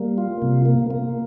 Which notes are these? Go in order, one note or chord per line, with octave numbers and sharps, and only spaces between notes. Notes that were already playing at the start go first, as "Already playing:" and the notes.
Already playing: G3 A#3
F4
C3
A#3
A#3